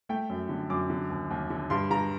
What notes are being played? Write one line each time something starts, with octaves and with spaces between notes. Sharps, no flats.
A3 G5
F#2
D3
F#2 D6
D3
D#2
D#2
D3
G2 C6
G2 A#5